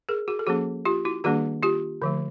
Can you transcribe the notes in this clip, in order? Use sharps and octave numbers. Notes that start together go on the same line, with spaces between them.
G#4 A#4
F#4 G#4
A4
F3 A#3 C#4 F#4 G#4
F4 G4
E4 F#4
D#3 G3 A#3 D4 F#4 G#4
F4 G4
D3 F3 A3